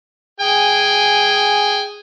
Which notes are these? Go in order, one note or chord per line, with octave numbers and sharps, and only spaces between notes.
G#4 G5 G#5